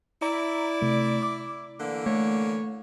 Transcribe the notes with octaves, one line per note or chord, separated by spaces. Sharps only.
E4 D5 A#5
C3 A3
D6
D3 E3 A#3
A3 C#5